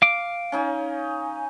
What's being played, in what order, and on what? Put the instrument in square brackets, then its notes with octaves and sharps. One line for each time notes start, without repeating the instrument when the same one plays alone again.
[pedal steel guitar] F5 D6
[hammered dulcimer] C#4 D#4 G#5